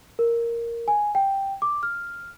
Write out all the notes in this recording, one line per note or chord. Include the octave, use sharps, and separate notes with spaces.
A#4
G#5
G5
D6
F6